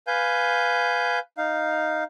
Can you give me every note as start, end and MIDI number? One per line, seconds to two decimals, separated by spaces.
0.07 1.19 71
0.07 1.19 77
0.07 1.19 80
0.07 1.19 91
1.38 2.04 63
1.38 2.04 77